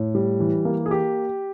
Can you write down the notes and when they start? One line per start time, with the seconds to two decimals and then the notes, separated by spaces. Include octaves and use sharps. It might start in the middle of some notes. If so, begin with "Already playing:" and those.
Already playing: A2
0.15 G3
0.40 E3
0.65 A#3
0.86 G#4
0.91 G4